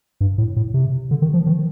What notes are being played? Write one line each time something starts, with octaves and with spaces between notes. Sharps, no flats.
G2
A2
A2
C3
D3
D#3
F3
D#3